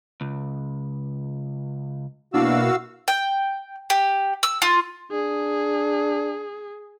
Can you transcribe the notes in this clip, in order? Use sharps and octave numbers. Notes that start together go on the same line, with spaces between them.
C#2
B2 A#3 D4 E4 F#4 F5 E6
G5
G4
E6
F4
D4 G#4